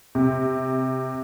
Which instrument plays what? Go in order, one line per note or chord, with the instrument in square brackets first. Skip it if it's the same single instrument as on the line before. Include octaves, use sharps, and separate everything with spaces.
[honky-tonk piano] C3